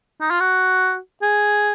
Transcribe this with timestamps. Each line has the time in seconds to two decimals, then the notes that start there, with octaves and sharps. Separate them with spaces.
0.21 D#4
0.31 F4
0.40 F#4
1.22 G#4